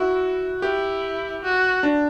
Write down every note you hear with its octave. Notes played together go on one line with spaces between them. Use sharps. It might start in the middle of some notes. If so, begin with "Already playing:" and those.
Already playing: E4 F#4
E4 G4
F#4
D4